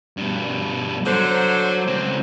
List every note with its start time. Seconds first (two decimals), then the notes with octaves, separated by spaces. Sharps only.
0.17 G2 B2
1.06 D3 F#3 C5
1.87 C#2 C4